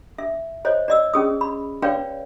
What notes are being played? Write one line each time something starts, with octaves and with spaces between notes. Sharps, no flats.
E5
C5 C#5 D#5
D5 D#5 E6
C#4 G#4 D#6
B5
B4 C#5 D5 F5 G5